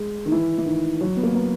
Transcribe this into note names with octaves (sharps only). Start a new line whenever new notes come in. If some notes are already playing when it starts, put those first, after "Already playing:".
Already playing: G#3
D#3
E3
E3
D#3
F#3
B3
A#3
B3